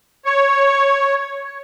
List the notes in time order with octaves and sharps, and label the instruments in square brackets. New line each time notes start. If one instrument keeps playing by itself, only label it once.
[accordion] C#5